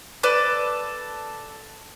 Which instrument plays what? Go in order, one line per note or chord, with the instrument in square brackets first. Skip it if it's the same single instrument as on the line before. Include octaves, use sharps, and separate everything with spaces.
[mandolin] A4 B4 D5